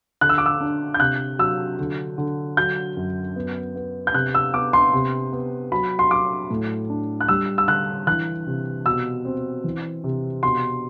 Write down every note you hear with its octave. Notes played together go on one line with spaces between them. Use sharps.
D3 F#6
E6
D6
E6
D4
G6
C3 F#6
F#3 E6
D3
D3
F#3 G6
F#2
B3
B3
G6
C3 F#6
E6
B3 D6
C6
C3
B3
F#3 B5
C6
F#3 D6
A2
D4
F#6
G3 E6
E6
D3 F#6
E3 F#6
C3
B2 E6
C4
E3
C3
B2 C6